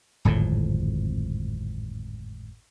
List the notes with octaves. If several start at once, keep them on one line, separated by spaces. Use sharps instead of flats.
D1 G#1 F2 A2